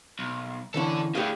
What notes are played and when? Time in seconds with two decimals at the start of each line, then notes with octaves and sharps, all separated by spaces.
0.19 B1
0.74 D3 E3 C#4 A4 D5
1.15 A2 D3 G4 G#4 F5